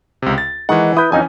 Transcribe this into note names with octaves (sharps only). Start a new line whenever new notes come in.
C#2 C3
A6
D#3 E3 G#3 D#4 F#5
E4 B4 D#6 G6
F2 E3 C#4 D#4 G#5